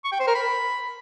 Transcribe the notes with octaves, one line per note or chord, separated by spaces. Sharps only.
C#6
G5
C5
A#4
B5